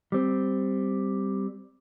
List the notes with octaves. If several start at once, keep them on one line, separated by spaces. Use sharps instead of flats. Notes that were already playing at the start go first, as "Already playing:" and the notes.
G3 C4